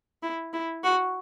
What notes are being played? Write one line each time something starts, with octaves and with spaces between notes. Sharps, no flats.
E4
E4
F#4